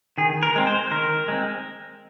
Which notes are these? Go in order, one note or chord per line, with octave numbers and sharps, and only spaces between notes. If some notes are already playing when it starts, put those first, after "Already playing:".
D#3 G#4
A#4
G#3 C4
C5
D#3 A#4
G#3 C4